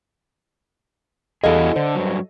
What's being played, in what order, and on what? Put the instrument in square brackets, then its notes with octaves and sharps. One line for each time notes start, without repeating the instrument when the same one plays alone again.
[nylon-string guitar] E2 G3 F5 [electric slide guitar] E4 F#4 G#4 [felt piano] A4 D#5
[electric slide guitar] D3 [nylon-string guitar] C5
[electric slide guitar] G2 F#3